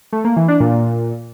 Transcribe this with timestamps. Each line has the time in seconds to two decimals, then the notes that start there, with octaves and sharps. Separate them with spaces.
0.13 A3
0.24 A#3
0.36 E3
0.48 D4
0.60 A#2